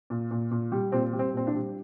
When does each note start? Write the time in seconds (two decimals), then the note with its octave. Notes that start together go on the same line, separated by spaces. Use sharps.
0.10 A#2
0.31 A#2
0.51 A#2
0.72 G3
0.92 A#2 C4
1.13 G3
1.19 C4
1.34 A#2 C4
1.47 D4
1.54 G3